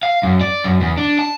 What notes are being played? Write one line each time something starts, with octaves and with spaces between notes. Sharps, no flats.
F5
F#2
D5
F#2
E2
D4
A5